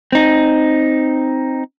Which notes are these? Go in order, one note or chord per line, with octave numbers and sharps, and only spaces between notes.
C4 D#4